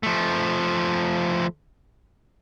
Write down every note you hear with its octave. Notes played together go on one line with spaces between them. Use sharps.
F3 A3